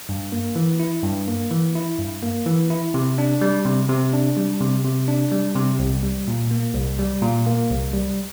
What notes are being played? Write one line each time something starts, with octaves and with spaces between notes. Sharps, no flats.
G2
A#3
E3
E4
G2
A#3
E3
E4
G2
A#3
E3
E4
C3
D4
G3
C3
C3
D4
G3
C3
C3
D4
G3
C3
C2
G3
A#2
A#3
C2
G3
A#2
A#3
C2
G3